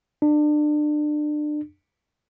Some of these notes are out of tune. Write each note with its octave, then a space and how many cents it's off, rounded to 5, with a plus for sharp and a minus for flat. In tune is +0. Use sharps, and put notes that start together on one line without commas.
D4 +30